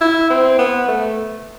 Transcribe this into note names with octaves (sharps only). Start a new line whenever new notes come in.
E4
C4
B3
A3